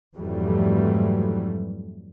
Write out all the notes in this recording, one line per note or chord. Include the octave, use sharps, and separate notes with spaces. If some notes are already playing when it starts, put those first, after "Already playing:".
F2 G#2 E3 F#3 G3 A3